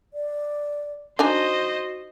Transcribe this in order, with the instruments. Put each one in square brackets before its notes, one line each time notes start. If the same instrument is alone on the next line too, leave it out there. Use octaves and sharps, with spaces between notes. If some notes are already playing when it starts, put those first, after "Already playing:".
[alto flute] D5
[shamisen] D4 D#4 G#5 [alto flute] F#4 [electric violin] C5 D#5